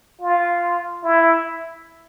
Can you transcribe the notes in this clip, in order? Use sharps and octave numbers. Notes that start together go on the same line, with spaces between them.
F4
E4